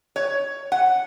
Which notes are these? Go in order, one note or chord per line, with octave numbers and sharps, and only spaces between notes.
C#5
F#5